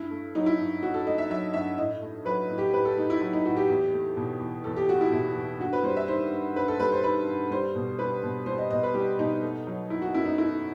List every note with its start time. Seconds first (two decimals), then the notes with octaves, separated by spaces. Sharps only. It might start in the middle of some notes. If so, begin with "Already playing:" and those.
Already playing: G2 E4
0.11 A3
0.35 F#3 D#4
0.46 E4
0.59 G2
0.82 G2 F#4
0.94 A4
1.07 A3 D#5
1.18 E5
1.30 F#3 E5
1.53 G2 E5
1.78 A2 D#5
2.01 A3
2.25 F#3 B4
2.50 A2
2.58 G4
2.73 A2 B4
2.85 A4
2.97 A3 D#4
3.10 E4
3.21 F#3 E4
3.33 D#4
3.45 A2 F#4
3.57 G4
3.69 E2
3.93 A3
4.17 B2
4.40 E2
4.64 E2 A4
4.77 G4
4.88 A3 F#4
5.01 E4
5.12 B2 E4
5.36 E2
5.60 G2 F#4
5.73 B4
5.83 G3 C5
5.97 E5
6.08 D#3 C5
6.31 G2
6.56 G2 B4
6.68 A4
6.80 G3 B4
6.92 C5
7.04 D#3 B4
7.27 G2
7.51 G3 C5
7.75 B2
7.99 G3 B4
8.23 B2
8.46 G3 C5
8.58 D#5
8.71 B2 D#5
8.83 B4
8.94 G3 G4
9.19 B2 D#4
9.42 A3
9.67 F#3
9.90 D#3 E4
10.02 F#4
10.14 F#2 E4
10.26 D#4
10.38 A3 E4